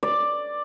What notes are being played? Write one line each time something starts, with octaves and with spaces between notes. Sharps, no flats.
D5